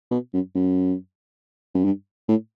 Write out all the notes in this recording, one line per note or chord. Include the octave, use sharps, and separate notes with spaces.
B2
F#2
F#2
F#2
G2
A2